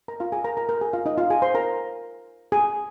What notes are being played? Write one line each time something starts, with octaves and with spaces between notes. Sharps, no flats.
A#4 A#5
F4 F5
G#4 G#5
A#4 A#5
A#4 A#5
A#4 A#5
G#4 G#5
F4 F5
D#4 D#5
F4 F5
G#4 G#5
C5 C6
A#4 A#5
G#4 G#5